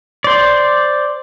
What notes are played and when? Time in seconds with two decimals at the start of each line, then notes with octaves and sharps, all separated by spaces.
0.24 C5 D5